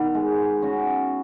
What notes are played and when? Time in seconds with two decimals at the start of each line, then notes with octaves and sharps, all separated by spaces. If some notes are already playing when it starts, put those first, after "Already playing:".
Already playing: D#3 B3
0.15 G#3
0.62 C#4 F#4